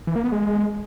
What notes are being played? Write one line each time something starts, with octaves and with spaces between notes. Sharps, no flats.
E3
A#3
B3
G#3